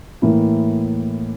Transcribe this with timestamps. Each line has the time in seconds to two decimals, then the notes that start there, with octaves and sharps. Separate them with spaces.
0.22 A2 E3 A#3 E4